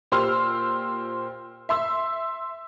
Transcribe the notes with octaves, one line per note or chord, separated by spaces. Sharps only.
A#2 G4 C5 C6 E6 F6
E5 C6 E6